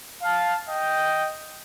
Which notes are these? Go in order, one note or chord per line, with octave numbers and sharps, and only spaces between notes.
F5 A5
D#5 G5